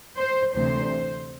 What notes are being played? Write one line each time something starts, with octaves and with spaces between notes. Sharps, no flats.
C5
D2 C3 E3 C5